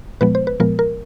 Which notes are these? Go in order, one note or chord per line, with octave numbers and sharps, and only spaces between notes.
A#2 F3 G#3 B3 B4
C5
B4
A#2 F3 G#3 B3 A#4
A#4